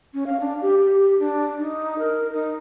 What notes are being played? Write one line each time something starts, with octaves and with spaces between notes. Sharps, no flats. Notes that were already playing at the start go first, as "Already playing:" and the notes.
C#4
F5
D4
G4
G4
D4
D#4
A#4
D#4